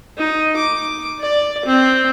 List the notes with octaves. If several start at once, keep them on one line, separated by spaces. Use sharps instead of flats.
D#4
D6
D5
C4